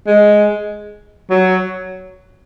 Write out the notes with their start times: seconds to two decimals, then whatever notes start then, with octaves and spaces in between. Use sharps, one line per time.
0.07 G#3
1.31 F#3